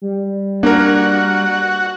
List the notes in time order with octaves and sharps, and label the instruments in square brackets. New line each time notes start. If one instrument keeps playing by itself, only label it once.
[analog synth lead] G3
[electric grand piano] A#3 A#4 [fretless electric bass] D4 [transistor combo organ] F#4